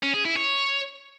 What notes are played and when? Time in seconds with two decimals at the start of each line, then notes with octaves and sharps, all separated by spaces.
0.03 C#4
0.14 G#4
0.25 E4
0.37 C#5